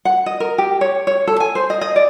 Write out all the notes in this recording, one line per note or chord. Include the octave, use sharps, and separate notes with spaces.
F#5
D#5
A#4
G4
C#5
C#5
A4
G#5
C5
D#5
D#5
D5